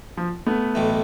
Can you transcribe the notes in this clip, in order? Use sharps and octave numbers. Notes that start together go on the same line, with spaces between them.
F3
A3 B3
B1 A2 E3